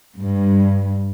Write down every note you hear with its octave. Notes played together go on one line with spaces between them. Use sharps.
G2